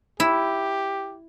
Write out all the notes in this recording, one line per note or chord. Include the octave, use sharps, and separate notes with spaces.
E4 G4